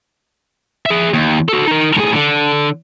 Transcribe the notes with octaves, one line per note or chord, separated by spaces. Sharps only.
G#4 E5
D#2
F#4 A4
D#4 A#4
A2 G#4
D3